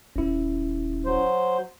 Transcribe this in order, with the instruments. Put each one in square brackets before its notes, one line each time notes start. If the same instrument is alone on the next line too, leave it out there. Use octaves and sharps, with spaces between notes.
[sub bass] D#1 [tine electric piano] C#4 E4
[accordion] F#3 C5